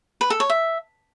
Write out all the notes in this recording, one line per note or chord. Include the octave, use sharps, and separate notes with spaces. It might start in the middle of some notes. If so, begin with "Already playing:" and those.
B4
A4
C#5
E5